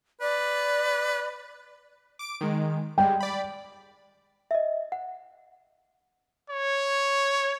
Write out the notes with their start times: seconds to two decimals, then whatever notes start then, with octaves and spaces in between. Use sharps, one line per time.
0.21 B4 D5
2.19 D6 D7
2.41 D#3 G#3
2.98 G3 G#3 G5
3.20 D5 B5
4.51 D#5 E5
4.92 F#5
6.50 C#5